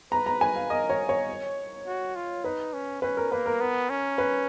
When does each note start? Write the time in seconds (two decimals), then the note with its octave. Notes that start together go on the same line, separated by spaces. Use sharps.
0.12 B4 A#5
0.26 A#5
0.41 G#5
0.56 F5
0.70 A#4 D#5
0.90 C#5
1.09 C#5
1.87 F#4
2.15 F4
2.44 D#4 B4
2.73 C#4
3.02 C#4 B4
3.17 A#4
3.32 A#3 B4
3.46 A#4
3.61 B3
3.90 C#4
4.18 B4